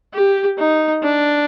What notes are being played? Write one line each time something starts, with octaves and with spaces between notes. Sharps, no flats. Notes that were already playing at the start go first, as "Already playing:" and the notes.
G4
D#4
D4